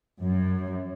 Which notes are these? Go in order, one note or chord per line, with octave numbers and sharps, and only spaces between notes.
F#2